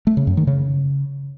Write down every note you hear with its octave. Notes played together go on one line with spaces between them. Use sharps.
A3
C#3
F#2
D#3
C#3